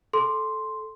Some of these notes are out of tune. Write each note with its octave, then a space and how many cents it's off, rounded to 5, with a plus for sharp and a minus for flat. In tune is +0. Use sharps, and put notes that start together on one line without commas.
A4 -10 C6 +0